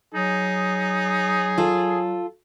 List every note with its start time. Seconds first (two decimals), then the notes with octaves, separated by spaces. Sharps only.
0.14 F#3 D#4 G#4
1.58 F4 A4